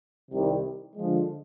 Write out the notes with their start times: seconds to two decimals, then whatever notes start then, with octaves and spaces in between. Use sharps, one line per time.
0.30 C2 C3 D#3 G3
0.95 D3 F3 G#3